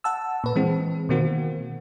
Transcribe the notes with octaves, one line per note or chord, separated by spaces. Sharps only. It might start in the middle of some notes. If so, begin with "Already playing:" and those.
F#5 A5 E6
A#2 B4
E3 G#3 C4
B2 D#3 A#3 C4 F#4